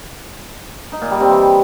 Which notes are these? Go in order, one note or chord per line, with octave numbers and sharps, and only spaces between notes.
D#4
A#2
G3
C4
E3